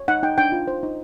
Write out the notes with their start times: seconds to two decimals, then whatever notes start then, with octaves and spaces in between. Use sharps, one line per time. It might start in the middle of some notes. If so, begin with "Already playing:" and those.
Already playing: C#5
0.08 D#4 F#5
0.23 D#4 G5
0.38 D4 G5
0.52 F4
0.68 C5
0.83 D#4